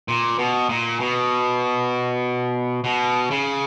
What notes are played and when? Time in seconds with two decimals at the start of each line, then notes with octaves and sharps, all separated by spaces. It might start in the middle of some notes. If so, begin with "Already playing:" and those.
0.08 A#2
0.39 B2
0.69 A#2
1.00 B2
2.84 B2
3.31 C#3